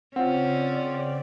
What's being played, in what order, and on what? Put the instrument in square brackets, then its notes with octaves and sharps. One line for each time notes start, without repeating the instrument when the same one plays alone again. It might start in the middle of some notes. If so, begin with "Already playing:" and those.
[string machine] C#3 D5 [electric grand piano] C4 F4 [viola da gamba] C#4 [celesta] F#5